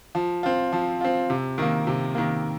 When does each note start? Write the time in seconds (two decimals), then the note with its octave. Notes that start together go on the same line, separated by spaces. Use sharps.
0.15 F3
0.43 C4 F4
0.73 F3
1.01 C4 F4
1.30 C3
1.58 D#3 A#3
1.87 C3
2.15 D#3 A#3